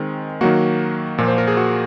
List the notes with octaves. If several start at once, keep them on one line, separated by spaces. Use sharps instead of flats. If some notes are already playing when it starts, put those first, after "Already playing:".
Already playing: D#3 G#3 C4
D#3 F#3 A#3 F#4
A#2 F3 A#3
C5
A#4
G#4
F#4